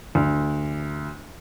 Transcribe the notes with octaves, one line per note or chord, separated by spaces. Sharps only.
D2